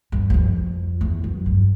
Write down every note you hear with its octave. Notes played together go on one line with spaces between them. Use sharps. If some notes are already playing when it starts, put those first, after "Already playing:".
G2
E2
F2
E2
F#2
G2